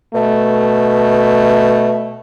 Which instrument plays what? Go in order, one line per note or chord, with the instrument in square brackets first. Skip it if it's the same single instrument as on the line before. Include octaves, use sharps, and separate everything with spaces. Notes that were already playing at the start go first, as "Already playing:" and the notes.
[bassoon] B2 [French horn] A3